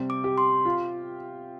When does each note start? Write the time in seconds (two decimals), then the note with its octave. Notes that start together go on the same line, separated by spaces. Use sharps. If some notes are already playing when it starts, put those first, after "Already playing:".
Already playing: C3 G3 C4
0.10 D6
0.24 G4
0.38 C6
0.65 F4